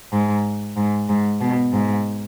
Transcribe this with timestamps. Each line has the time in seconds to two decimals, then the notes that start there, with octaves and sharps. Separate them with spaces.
0.12 G#2
0.77 G#2
1.09 G#2
1.41 B2
1.72 G#2